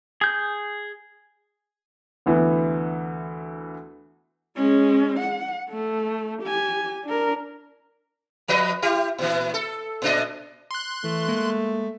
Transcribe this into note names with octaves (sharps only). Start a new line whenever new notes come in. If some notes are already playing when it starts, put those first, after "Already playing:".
G#4 G6
D2 E3 B3
G#3 C#4
F#5
A3
G4 G#5
D4 A#4
F3 B4 D#5
E4 G4
A#2 E3
A4
A#2 D4 D#5
C6 F#6
E3 A3
G#3 A#3